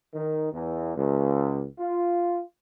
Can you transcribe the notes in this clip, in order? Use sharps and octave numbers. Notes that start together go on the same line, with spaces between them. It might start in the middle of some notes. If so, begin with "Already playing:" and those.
D#3
E2
C#2
F4